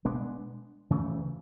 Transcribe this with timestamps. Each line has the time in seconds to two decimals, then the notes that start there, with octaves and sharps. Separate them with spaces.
0.05 B2 G#3 B3 D4
0.90 D2 C#3 E3 A3